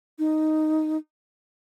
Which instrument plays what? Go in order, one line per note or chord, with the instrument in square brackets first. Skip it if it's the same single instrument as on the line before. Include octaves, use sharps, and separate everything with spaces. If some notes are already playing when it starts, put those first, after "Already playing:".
[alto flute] D#4